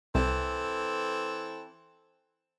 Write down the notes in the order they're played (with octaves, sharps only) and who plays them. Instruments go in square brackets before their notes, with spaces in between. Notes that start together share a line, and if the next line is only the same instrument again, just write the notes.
[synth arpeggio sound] C2 [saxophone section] E3 C4 A4